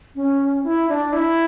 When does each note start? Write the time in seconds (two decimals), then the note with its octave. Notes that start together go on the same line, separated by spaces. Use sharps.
0.16 C#4
0.64 E4
0.89 D4
1.13 E4